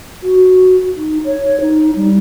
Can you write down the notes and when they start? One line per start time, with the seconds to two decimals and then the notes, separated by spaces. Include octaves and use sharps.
0.23 F#4
0.96 D#4
1.25 C#5
1.61 D#4
1.96 G3